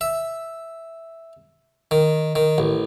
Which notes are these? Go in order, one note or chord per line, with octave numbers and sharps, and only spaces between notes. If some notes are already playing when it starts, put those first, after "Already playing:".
E5
D#3
D#3
A1